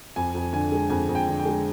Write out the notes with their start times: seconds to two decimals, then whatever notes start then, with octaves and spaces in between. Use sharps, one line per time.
0.16 F2 G#5
0.35 F2
0.53 D3 G#5
0.72 G#3
0.90 F2 G#5
1.09 F2
1.15 G5
1.27 D3
1.39 G5
1.45 G#3